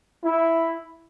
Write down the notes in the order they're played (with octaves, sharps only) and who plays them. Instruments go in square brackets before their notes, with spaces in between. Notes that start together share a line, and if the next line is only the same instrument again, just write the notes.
[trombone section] E4